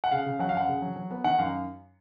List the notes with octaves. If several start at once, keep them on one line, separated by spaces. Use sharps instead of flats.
F#5
C#3 F5
C#3
F#3 F#5
F5
F#2 F#5
C#3
F#3
F#3
B3
D#3 F#5
F#2 F5